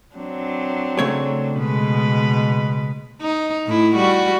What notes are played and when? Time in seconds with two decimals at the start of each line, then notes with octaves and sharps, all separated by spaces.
0.15 F#3 C4 D4
0.99 C#3 A3 C#5
1.55 B2 G#3 B4
3.21 D#4
3.67 A2 E4
3.96 G3 F#4